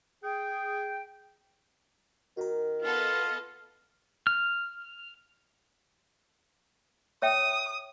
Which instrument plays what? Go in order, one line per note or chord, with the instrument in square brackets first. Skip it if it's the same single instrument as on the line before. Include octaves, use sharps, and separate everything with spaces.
[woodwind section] G#4 G5
[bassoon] D#3 [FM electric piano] F#4 A#4
[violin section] B3 A4 D#5 [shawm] F4
[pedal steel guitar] F6
[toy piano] C#5 E5 G5 [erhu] D#6